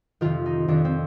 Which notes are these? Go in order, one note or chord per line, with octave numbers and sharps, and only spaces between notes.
F2 C3 D#3 F4
D#4
F2 D#3 D4
C4